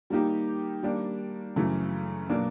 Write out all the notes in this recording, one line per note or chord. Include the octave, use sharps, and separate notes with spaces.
D#3 G3 A#3 D#4 G4
D#3 G3 A#3 D4
F#2 C#3 E3 A3
B2 F#3 A#3 D4